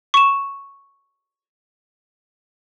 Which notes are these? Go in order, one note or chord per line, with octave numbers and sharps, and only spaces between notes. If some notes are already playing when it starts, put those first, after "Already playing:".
C#6 E7